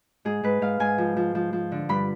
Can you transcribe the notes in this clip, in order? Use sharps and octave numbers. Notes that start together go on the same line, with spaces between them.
G#2 G#4
G#2 B4
G#2 F5
G#2 G#5
F3
F3
F3
F3
D3
G2 B5